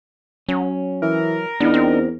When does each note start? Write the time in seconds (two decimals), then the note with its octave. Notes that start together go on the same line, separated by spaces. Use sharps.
0.49 F#3 C#4
1.02 E3 A#4
1.61 E2 B3 D4 D#4
1.74 C4